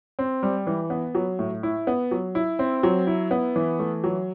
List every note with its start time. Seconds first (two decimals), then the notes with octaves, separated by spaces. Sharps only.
0.19 C4
0.43 G3
0.67 E3
0.90 B3
1.15 F#3
1.39 A2
1.63 E4
1.87 B3
2.11 F#3
2.35 E4
2.59 C4
2.83 F#3
3.07 E4
3.31 B3
3.56 E3
3.79 A3
4.04 F#3